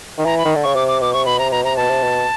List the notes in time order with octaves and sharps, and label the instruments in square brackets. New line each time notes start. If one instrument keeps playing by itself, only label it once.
[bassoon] D#3
[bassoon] E3 [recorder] A#5
[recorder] B5
[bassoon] D#3
D3
[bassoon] C#3 [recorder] C#6
[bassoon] C3 [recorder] D6
[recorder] D6
[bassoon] B2 [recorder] D6
[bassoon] C3 [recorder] C#6
[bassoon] B2 [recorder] B5
[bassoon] C3 [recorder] A#5
[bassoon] B2 [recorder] A#5
[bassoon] C3 [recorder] A#5
[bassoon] B2 [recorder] A5
[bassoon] C3
B2